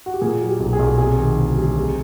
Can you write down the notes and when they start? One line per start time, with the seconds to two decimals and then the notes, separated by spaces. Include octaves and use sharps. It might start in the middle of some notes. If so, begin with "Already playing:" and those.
0.06 F#4
0.14 G4
0.21 A#2 G#4
0.41 F#3
0.47 G4
0.60 B1
0.73 G#4
0.79 B1
0.98 C3 G#4
1.18 D#3
1.37 D2
1.57 G3
1.76 C3 G#4